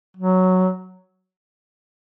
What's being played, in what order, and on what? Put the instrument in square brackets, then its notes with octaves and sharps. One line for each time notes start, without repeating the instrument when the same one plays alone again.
[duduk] F#3